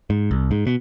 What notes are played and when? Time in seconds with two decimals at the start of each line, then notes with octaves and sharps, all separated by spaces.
0.10 G#2
0.31 C2
0.51 G#2
0.67 B2